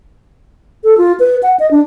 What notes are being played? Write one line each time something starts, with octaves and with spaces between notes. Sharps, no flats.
A4
F4
B4
F#5
D#5
D4